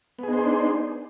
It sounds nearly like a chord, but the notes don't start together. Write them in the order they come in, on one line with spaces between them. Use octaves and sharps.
B3 G#4 D#4 C5 D4